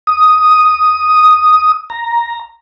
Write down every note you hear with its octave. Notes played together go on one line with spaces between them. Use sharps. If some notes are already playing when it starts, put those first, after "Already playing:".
D#6
A#5